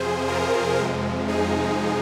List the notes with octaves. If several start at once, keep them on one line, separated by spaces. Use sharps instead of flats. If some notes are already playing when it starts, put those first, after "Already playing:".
Already playing: F2 C3 F3 G#4 C5
F4 A#4
F2 C3 F3 G#3
D#4 G#4